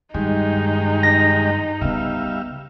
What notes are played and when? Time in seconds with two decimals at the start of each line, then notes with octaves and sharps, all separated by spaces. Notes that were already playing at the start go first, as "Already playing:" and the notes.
0.14 G2 D#3 G#3 D#4 G4
1.03 A#6
1.81 C#3 G3 B3 E5 F5